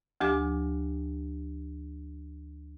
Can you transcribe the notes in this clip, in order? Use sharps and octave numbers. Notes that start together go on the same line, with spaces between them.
D2 F3 G4 G#5 D6